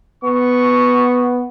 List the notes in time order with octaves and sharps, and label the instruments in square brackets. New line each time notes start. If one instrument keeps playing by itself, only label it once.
[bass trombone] B3 [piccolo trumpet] C#6